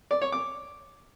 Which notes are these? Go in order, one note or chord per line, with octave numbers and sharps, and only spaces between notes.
D5
C#5
D6